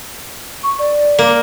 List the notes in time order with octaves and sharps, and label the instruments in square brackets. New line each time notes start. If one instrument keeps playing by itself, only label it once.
[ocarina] C#6
D5
[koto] A#3